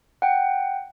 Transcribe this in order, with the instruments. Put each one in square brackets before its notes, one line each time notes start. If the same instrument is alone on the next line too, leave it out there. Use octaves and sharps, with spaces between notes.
[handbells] F#5 G5